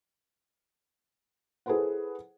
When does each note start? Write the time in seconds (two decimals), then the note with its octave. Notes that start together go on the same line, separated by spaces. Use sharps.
1.66 E4 G#4 A4 B4 C5 F#5